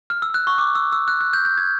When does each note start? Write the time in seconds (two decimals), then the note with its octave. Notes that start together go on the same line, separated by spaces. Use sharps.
0.10 F6
0.22 E6
0.34 F#6
0.47 C#6
0.58 D6
0.75 E6
0.92 E6
1.08 F#6
1.21 F#6
1.33 G6
1.45 G6
1.58 G#6